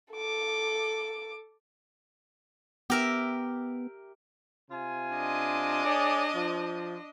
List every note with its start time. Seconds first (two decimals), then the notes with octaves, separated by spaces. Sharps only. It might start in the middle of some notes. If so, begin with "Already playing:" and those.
0.13 A4 D6
2.90 B3 G4 A#4 E5
4.71 C3 F4 G#5
5.15 D4 D#5
5.84 G#4 C#5 D5
6.35 F3